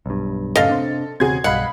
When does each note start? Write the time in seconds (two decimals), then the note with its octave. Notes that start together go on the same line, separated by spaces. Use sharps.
0.06 B1 G2
0.56 F#2 A2 C#3 A4 D#5 F5
0.69 C3 C4 D4
1.20 E1 C#3 C4 F#4 G#4 G#6
1.44 B1 G2 D#5 F5 F#5 B5